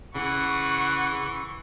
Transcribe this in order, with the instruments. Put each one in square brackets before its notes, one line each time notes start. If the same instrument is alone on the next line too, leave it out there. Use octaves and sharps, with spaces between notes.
[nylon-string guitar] C#3 [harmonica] E3 [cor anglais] F#5 [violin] C#6